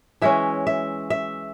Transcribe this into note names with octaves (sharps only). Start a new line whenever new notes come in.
E3 G#3 C#4 E5
E5
E5